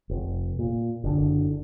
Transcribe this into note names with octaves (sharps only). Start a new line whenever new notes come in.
F1
A#2
F#1 D3